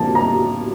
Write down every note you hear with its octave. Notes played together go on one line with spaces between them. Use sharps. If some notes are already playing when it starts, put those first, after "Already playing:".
Already playing: F2 D3 F3 A#3 A5
A#5